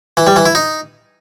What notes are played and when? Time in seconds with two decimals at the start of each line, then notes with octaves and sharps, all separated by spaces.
0.17 E3
0.27 G3
0.36 E3
0.46 E4
0.55 D#4